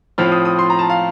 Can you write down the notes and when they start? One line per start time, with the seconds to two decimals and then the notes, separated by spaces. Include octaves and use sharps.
0.18 A2 F3 C4 F4 F6
0.32 D#6
0.45 D#6
0.59 C6
0.70 A#5
0.79 A5
0.90 F5